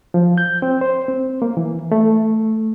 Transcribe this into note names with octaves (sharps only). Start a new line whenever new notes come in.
F3
G6
C4
C5
C4
A#3
E3
A3